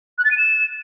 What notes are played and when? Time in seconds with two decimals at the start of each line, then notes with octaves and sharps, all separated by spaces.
0.18 F#6
0.25 A6
0.31 D#7
0.38 E7